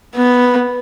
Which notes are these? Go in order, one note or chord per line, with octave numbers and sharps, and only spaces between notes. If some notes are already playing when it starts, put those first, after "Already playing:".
B3